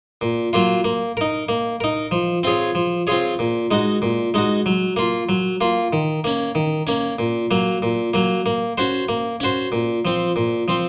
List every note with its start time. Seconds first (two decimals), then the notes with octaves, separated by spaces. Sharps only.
0.21 A#2
0.53 F#3 A#3 F4
0.84 A#3
1.17 D#4 A#4
1.49 A#3
1.80 D#4 A#4
2.11 F3
2.43 C4 F4 G#4 C#5
2.75 F3
3.07 C4 F4 G#4 C#5
3.39 A#2
3.71 G#3 D#4 F#4
4.02 A#2
4.34 G#3 D#4 F#4
4.66 F#3
4.96 A#3 F4
5.29 F#3
5.61 A#3 F4
5.93 D#3
6.24 A#3 C#4
6.55 D#3
6.87 A#3 C#4
7.19 A#2
7.51 F#3 A#3
7.82 A#2
8.14 F#3 A#3
8.46 A#3
8.78 C#4 F#4 C5
9.09 A#3
9.40 C#4 F#4 C5
9.72 A#2
10.05 F3 C4
10.36 A#2
10.68 F3 C4